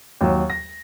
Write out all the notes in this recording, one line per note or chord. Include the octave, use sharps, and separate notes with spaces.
D#2 F#3
A#6